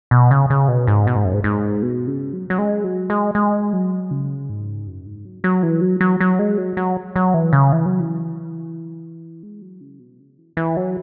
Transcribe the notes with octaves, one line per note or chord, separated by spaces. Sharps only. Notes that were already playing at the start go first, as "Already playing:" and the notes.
B2
C#3
C#3
B2
G#2
B2
G#2
F#2
G#2
G#2
B2
C#3
F#3
F#3
G#3
F#3
G#3
G#3
F#3
C#3
G#2
F#2
G#2
F#3
F#3
E3
F#3
F#3
F#3
G#3
F#3
F#3
F#3
E3
C#3
E3
F#3
E3
G#3
F#3
C#3
B2
C#3
E3
E3
F#3